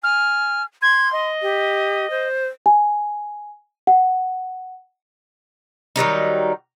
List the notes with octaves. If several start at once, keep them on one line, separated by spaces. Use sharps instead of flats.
G#5 F6
C6 G#6
D#5
G4
C5
G#5
F#5
D#3 F#3 G3 D#4